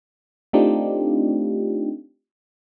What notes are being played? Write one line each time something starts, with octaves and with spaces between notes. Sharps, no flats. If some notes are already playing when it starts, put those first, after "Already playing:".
A3 C4 D4 D#4 F4 G4